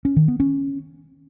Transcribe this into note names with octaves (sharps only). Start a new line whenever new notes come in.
C#4
D#3
B3
C#4